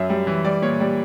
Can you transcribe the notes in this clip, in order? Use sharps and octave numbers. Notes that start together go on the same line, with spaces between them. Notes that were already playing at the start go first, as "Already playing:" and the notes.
Already playing: F#2 E5
G3
E3
G3 D5
A#2 C#5
G3 D5